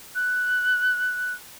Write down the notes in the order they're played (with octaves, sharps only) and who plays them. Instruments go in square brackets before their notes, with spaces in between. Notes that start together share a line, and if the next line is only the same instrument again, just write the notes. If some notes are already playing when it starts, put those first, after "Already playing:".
[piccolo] F#6